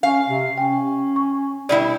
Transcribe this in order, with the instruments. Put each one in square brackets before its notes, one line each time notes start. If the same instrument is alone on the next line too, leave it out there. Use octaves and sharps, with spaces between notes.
[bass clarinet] C#4 [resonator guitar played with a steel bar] F5
[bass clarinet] C3
[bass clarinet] C#4 [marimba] G5
[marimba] C#6
[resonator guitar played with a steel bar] B2 G3 E4 [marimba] D5